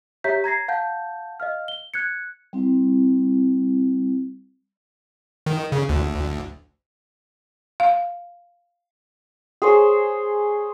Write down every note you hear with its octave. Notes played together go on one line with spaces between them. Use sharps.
G4 C#5 E5 A#5 G6 B6
A#5 G#6 A#6 C7
F5 F#5 A5 G6
D#5 F5 F6
G7
F#6 G#6 C#7
G3 C4 E4
D#3
C#3
D2
F5
G#4 C5 C#5